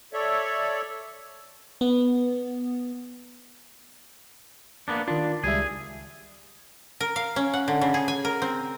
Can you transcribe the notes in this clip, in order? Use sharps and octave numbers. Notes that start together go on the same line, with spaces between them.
A4 C#5 D5 E5
B3
A#3 B3 D4
D#3 D4 F4
C#2 G3 G#4 E5
A#4
F5
C#4
F#5
D3
C#3
G#4
G#5
A#4
C4